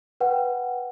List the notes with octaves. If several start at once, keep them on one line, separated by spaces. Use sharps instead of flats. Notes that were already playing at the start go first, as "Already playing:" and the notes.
B4 F#5 G5